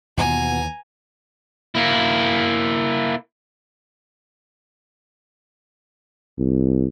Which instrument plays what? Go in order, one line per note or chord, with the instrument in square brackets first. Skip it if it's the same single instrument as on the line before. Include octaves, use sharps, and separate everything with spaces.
[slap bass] D#2 E3 [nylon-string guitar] B2 F4 [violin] G#5 A#5
[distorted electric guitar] A#3 E4
[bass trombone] C2